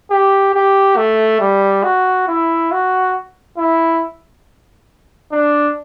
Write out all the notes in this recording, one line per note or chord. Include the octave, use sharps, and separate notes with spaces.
G4
G4
A3
G3
F#4
E4
F#4
E4
D4